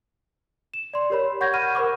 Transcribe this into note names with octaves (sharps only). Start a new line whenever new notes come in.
E7
D5 C6
G4 A#4 C#5 B5
F#5 C#6 G6 G#6 A#6
F#5 B5 F6 D#7
A#4 C5 F#5 B5 C#6 D6